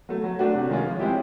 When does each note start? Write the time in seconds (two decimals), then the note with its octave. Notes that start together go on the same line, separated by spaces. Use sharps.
0.09 F#3 A3
0.24 F#3
0.39 A3 D4 F#4
0.54 C3
0.69 D#3 G#3 C#4 F4
0.84 F3
0.99 G#3 C4 E4 G4